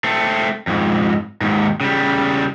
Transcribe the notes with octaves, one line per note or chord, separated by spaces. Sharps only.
A3 C4
F2 G#2
D#2 G#2
C#3 G3